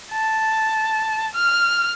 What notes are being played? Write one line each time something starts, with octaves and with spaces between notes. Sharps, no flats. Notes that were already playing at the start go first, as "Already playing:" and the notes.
A5
F6